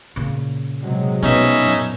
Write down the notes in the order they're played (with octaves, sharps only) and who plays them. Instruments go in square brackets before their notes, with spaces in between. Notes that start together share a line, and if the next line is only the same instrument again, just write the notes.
[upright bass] A#2 C#3
[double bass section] C3 F#3 G#3
[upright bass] B2 [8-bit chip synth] C#4 D#4 E5
[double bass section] F#2 A#2